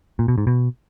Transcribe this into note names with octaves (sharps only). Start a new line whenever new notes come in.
A#2
B2
G#2
B2